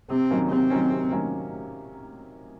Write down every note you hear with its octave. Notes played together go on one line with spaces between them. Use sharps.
C3 C4
D#3 F#3 A#3 C#4
C3 C4
D#3 F#3 A#3 C#4
C3
D#3 F#3 A#3 C#4